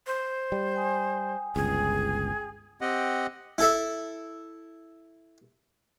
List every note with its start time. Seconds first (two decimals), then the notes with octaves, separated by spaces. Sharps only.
0.07 C5
0.52 G3
0.75 G5 G#5 D#6
1.56 G1 C#2 G#4
2.81 C4 G4 D#5 F#5
3.58 E4 A4 E5